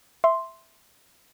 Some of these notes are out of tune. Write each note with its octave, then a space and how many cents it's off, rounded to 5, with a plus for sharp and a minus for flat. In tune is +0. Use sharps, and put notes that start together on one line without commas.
E5 +0 C6 +0